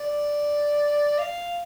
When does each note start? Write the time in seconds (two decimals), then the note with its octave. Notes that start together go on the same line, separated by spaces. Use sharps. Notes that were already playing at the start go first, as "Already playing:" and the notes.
Already playing: D5
1.19 F5